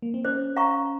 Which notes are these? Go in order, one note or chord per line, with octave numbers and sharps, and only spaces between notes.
A#3
C4
C#4 C5
F5 A#5 C#6